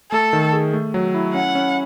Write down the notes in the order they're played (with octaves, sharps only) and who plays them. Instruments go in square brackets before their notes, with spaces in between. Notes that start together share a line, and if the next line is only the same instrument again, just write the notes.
[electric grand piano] A3 [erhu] A4
[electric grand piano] D#3
G#4
A3
F#3
E4
[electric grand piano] C#4 [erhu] F#5
[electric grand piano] C#4